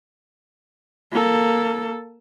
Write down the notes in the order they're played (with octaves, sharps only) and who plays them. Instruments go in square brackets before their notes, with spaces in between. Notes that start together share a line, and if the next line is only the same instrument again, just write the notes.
[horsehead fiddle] A#3 A4